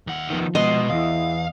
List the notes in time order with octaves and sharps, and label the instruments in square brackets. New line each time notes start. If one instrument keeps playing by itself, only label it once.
[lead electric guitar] D#2 F#5
[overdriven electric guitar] D#3 B3 [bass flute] F3
[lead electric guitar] C2 G#3 [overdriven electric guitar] B2 B3 [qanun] D#5 C6
[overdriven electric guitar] E2 [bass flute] E3 [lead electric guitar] F5